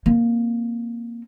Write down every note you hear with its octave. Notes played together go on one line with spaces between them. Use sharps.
A#3 C4